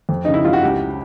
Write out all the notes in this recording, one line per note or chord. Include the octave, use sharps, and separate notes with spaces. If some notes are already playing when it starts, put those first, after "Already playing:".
F2
C#3 D#4
E4
F#3 F4
F#4
C#2 G4